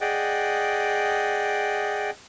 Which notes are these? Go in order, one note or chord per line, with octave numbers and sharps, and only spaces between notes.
G#4 D5 D#5 F#5 G5